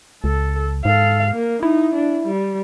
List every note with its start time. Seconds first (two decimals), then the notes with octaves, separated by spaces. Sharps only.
0.24 C#2 A4
0.85 G#2 A4 F5
1.31 A#3
1.63 D#4 E4
1.96 D4
2.26 G3